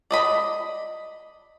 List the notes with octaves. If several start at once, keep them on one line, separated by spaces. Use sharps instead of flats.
D5 D#5 B5